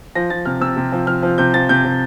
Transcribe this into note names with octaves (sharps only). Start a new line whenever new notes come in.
F3 A#6
F3 A6
C3 F6
C3 E6
C3
F3
F3 F6
F3
C3 G6
F3 A6
C3 G6
C3